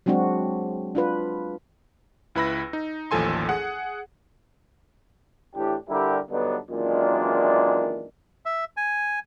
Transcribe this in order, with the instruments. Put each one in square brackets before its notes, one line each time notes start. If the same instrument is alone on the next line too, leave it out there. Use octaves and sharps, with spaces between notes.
[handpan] F#3 G#3 C4 D4 F#4
D4 F4 B4
[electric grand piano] C#2 E4 B4 B5 E6 A#6
D#4
A1 D#2 F3 A4 G#5 C6
G#4 F#5
[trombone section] A2 E3 D4 G4
D3 G3 E4 G4 A#4
G2 D3 F#3 B3 D4 D#4
F#2 A#2 D#3 E3 G#3 D4
[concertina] E5
G#5